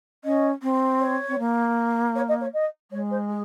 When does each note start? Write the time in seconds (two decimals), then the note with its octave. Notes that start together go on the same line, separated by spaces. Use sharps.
0.24 C#4 D#5
0.63 C4
1.01 C#5
1.29 C4
1.39 A#3
2.15 C#5
2.28 D#5
2.41 C#5
2.53 D#5
2.91 G#3 C#5
3.11 C5
3.29 G#4